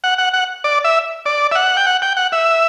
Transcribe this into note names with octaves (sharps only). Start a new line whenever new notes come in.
F#5
F#5
F#5
D5
E5
D5
E5
F#5
G5
F#5
G5
F#5
E5